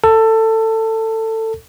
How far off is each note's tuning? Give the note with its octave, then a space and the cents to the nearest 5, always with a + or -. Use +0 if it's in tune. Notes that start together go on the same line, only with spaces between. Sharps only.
A4 +20